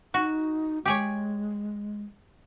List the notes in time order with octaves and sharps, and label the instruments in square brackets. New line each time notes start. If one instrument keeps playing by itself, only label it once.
[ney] D#4 [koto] F#4
[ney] G#3 [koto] G4 G#4 C#5